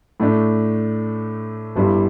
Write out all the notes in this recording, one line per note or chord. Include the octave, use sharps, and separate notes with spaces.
A2 A3 D4
G1 G2 G3 E4